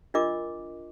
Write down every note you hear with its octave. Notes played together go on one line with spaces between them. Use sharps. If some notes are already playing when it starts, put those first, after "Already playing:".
D4 F4 A#4 D#5 D6